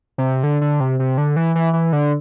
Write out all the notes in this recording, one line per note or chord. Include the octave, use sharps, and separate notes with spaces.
C3
D3
D3
C3
C3
D3
E3
E3
E3
D3